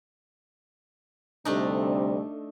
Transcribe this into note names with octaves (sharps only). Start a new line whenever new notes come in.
D2 C3 G3 A3 D4 D#4